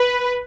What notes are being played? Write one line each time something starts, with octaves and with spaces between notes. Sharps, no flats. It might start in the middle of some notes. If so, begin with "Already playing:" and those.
Already playing: B4